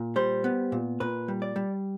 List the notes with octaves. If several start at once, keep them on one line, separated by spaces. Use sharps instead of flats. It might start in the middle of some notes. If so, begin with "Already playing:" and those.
Already playing: A#2
G3 C5
B3
A#2
A#2 B4
G3
D5
G3